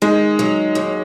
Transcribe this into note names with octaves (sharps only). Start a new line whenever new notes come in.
D#3 G#3
F#3
D#2